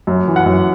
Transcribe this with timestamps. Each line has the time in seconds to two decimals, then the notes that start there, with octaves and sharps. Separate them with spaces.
0.07 F#2
0.28 E3
0.36 F#5
0.46 F#2